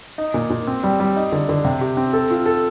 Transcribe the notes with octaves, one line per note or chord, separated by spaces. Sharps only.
D#4
A#2
A#2
C4
G3
G3
D#4
D3
D3
C3
G4
C4
A4
F4
A4